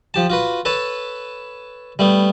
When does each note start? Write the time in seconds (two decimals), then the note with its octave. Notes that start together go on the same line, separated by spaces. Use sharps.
0.14 F3 G4 A5
0.30 F4 F#4 B4
0.65 A4 B4 C#5 A5
1.99 G3 A3 B3